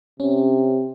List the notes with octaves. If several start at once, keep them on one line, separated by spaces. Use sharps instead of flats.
C3 C#4